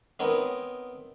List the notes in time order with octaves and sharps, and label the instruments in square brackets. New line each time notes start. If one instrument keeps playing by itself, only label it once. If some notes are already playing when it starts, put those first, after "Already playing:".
[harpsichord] B3 C4 D#4 A#4 C#5